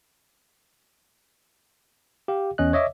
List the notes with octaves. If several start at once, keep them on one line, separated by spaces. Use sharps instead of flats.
G4 F5
E2 C#4 D#5 F#6
C#5 D#5 E5 D6